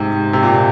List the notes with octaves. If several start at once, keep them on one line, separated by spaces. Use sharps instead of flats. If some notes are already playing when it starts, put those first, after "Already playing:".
Already playing: G#2 C3
C3
A#2